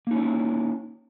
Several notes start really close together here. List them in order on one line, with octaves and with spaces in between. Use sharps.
A#3 D#4 C#4 E4